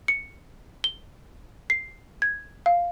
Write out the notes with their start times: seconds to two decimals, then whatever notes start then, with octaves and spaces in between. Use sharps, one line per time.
0.08 C#7
0.84 G7
1.70 C7
2.22 G#6
2.66 F5